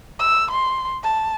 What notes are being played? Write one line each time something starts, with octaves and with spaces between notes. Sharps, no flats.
E6
C6
A5